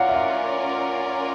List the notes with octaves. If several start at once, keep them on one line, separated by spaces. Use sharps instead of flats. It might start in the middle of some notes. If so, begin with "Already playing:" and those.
Already playing: C#4 F4 A#4 D5 F5 F#5
E5
F5